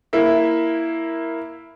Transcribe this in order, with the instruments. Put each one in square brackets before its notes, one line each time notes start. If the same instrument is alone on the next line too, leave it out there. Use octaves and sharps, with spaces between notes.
[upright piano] A#3 E4 E5